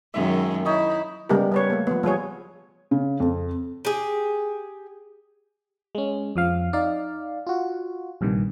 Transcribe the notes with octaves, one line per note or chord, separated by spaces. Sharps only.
F#2 D#3 G#3 E5
D#4 E4 C#5 D#5
C#3 G3 G#3 B3 G4 A#4
G3 B4 C#5
A3 A#3
F3 B3
F3 G3 G#4 C#5
C#3
F2
G4 G#4
G#3 C#4
F2 F3 F5
D#4 D5 F5
F4 F#4
A#1 G2 C3 D#3